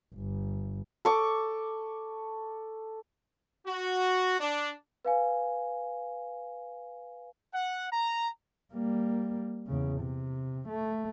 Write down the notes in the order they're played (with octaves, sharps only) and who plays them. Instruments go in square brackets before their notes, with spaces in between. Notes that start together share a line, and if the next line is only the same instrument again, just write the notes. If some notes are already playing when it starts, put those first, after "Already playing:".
[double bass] G1
[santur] A4 C#6 D6
[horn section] F#4
D4
[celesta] B4 F5 G#5
[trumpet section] F#5
A#5
[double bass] G3 A#3
E2 C#3
C3
A3